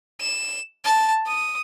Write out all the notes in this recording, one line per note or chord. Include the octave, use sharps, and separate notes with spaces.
E7
A5
D#6